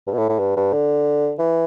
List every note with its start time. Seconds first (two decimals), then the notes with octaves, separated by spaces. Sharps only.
0.07 G2
0.14 B2
0.18 A2
0.29 A2
0.39 G2
0.57 G2
0.73 D3
1.39 E3